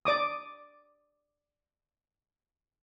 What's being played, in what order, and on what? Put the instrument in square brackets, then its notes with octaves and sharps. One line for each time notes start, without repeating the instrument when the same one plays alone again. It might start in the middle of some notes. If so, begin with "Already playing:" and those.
[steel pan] D5 D6 D#6